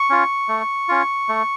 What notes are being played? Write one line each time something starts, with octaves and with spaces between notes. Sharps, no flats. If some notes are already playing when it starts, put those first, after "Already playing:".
Already playing: C#6
C#4 F4
A3
C#4 F4
A3